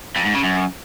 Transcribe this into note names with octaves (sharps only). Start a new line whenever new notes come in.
F2
G#2
C#3
F#2